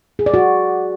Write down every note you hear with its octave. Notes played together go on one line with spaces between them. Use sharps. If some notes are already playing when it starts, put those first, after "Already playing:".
G#4
D5
F#4